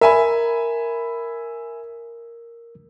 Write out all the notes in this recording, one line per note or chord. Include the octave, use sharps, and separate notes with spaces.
A#4 E5 G#5 B5